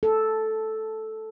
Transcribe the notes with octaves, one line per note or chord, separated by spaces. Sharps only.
A4